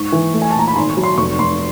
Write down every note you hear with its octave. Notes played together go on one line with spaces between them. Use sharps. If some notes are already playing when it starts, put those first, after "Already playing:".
Already playing: G#2 C#6
E3
A3
G#5
A5
A#2 A#5
B5
G#1 C6
C#6
F#3
C6
F1 C#6
F1 C6